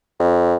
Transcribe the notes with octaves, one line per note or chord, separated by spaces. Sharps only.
F2